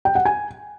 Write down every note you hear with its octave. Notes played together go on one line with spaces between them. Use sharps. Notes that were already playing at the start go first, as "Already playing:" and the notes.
G5
F#5
G#5